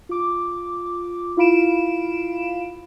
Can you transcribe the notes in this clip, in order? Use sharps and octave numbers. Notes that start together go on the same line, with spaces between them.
F4 D6
E4 F4 F5 B5 D7 E7